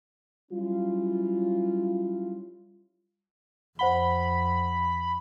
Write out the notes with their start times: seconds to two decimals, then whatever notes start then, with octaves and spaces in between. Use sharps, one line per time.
0.52 F#3 G3 C#4 E4 F4
3.79 F2 C5 F#5 B5 G7